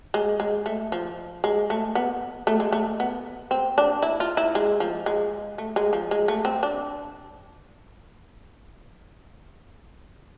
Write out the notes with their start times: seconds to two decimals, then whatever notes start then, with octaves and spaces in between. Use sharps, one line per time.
0.14 G#3
0.40 G#3
0.66 A3
0.92 F3
1.44 G#3
1.70 A3
1.95 B3
2.47 A3
2.60 G#3
2.72 A3
3.00 B3
3.51 C4
3.78 D4
4.02 E4
4.20 F4
4.37 E4
4.55 G#3
4.80 F3
5.06 G#3
5.58 A3
5.76 G#3
5.93 F3
6.11 G#3
6.28 A3
6.45 C4
6.63 D4